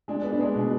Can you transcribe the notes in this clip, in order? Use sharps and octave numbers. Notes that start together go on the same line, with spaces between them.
G#3 D4
B3
D4
G#3
B2